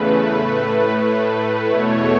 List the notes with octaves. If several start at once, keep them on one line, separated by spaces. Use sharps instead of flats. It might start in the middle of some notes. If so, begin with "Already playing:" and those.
Already playing: E2 C#3 A3 B4
A2 A3
A2 A3
E2 B2 A3 C#5